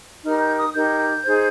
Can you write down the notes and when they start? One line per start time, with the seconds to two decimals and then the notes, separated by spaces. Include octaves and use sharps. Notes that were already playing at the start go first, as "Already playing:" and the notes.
0.24 D#4 G4 A#4 F6
0.41 G6
0.57 D#6
0.74 D#4 G4 A#4 G6
1.24 D#4 G#4 C5